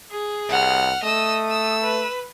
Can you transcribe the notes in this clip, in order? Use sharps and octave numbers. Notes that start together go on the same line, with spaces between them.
G#4
C2 F#5 F6
A3 D#5 D#6 E6
E6
B4